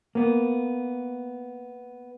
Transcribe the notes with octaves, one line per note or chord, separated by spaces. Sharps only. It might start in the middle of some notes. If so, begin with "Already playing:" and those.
A#3 B3